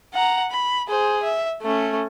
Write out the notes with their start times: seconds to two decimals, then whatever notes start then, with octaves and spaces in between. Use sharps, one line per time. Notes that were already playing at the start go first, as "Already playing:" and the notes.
0.14 F#5 A#5
0.51 B5
0.89 G#4 C5
1.23 E5
1.62 A3 C#4